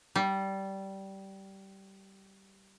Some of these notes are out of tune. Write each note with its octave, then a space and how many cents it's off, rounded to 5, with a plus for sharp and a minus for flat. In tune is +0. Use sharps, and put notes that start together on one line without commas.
G3 -15